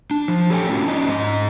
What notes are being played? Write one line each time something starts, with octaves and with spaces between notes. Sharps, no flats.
D4
F3
G4 A4 C#5 D#5 G5 G#5
A2 C#4 F4 F#4
C#4 D4 D#5
G#2 G#3 D#5